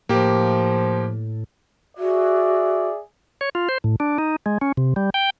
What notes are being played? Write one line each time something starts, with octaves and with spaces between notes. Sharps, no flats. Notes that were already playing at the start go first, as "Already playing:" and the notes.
A2 F3 A#3 G4
F#4 G#4 D5 E5
C#5
F4
C5
A2
D4
D#4
G#3
C#4
C3
G3
G5